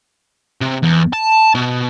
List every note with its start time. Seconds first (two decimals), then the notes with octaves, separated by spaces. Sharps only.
0.61 C3
0.83 E2
1.13 A5
1.55 B2